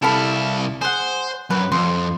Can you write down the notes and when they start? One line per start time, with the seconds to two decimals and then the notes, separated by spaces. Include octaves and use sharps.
0.03 C2 E4 A4 F5 B5
0.81 G#4 C5 F#5
1.50 F#2 B4
1.72 F2 C6